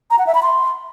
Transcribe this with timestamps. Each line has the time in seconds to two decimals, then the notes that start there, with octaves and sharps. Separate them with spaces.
0.11 A#5
0.19 F#5
0.27 E5
0.35 B5
0.43 C6